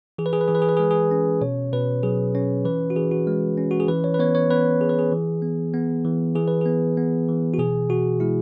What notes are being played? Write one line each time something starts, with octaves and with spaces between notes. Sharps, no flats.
E3 G#4
B4
G#4
B4
E3 G#4
B4
G#4
B4
G#4
G#3 B4
G#4
C#4
B2 C#5
B2 B4
F#3 G#4
C#4 C#5
E3 B4
F#4
E3 G#4
F#4
G#3
C#4
F#4
G#4
E3 B4
C#5
B4
B3 C#5
C#5
B3 B4
E3 G#4
B4
G#4
E3
B3
B3
E3
E3 G#4
B4
B3 G#4
B3
E3
F#4
B2 G#4
B2 F#4
G#3 E4